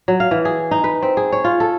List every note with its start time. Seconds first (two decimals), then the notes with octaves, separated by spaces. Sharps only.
0.08 F#3
0.20 F5
0.31 E3
0.45 G#4
0.71 D#4
0.84 B4
1.02 C4
1.17 G#4
1.32 C#5
1.44 F4
1.60 A4